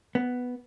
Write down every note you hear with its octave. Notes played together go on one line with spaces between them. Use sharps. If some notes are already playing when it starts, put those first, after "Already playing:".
B3